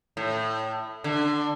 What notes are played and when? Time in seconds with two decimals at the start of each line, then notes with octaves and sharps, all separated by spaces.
0.17 A2
1.04 D3